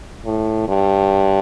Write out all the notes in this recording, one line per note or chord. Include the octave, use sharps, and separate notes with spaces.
A2
G2